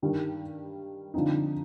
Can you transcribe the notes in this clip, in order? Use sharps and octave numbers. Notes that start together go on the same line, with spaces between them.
G2 D#3 G3
D3 F3 C4 D#4